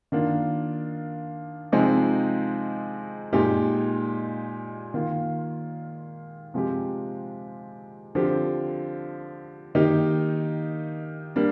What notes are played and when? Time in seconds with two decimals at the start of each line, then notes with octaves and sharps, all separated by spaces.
0.12 D#3 A#3 D4 F4
1.72 C3 F3 G#3 C4 D#4
3.33 A#2 G#3 D#4 G4
4.94 D#3 A#3 F4
6.54 C3 F3 G#3 C4 G4
8.15 D3 F3 C4 G4
9.75 D#3 A#3 D#4 G4
11.36 G3 A#3 D4